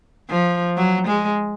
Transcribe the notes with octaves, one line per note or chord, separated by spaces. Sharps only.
F3
F#3
G#3